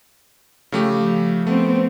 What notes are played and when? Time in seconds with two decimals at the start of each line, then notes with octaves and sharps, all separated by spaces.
0.72 C#3 F3 A3 G4
1.47 A3 B3 C4